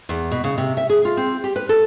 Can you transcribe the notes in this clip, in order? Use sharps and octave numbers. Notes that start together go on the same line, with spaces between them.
E2
B2
C#3
C3
E5
G#4
F4
C4
G4
B4
A4